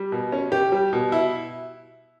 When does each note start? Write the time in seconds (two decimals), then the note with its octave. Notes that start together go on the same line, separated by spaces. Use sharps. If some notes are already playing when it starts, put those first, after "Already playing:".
Already playing: G3
0.12 B2
0.32 C#4
0.52 G4
0.72 G3
0.93 B2
1.12 E4